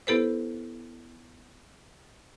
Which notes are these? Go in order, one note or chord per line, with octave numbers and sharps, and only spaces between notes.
B3 E4 G4 A4 B4 C5